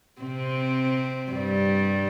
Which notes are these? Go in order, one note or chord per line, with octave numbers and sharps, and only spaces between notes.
C3 C4
G2 G3